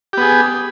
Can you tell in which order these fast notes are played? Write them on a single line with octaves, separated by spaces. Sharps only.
G4 B3 G#4